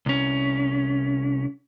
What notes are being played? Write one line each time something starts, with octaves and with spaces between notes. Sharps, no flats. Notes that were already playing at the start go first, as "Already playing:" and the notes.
C2 C#4